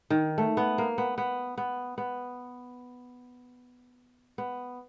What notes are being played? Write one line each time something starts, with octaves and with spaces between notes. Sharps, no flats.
D#3
A3
B3
A#3
B3
B3
B3
B3
B3